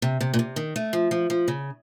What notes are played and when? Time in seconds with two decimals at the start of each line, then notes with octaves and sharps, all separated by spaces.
0.02 C3
0.21 C3
0.34 A#2
0.39 C3
0.56 D#3
0.76 A3
0.93 F3
1.11 F3
1.30 F3
1.48 C#3